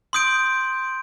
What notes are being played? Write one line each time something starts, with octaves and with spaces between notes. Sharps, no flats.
C6 D#6 G6 D7